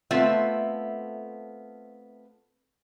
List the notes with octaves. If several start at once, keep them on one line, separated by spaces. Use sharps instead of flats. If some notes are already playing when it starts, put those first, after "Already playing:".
A3 B3 C4 F4 A4 E5